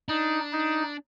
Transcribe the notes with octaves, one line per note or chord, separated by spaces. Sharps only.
D4 D#4
D#4